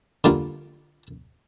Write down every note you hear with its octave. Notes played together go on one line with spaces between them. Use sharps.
D3 G3 A#3 F4